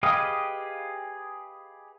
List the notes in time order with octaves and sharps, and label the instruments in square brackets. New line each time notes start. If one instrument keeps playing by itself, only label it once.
[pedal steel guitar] G4 G#4 B4 D#5 F5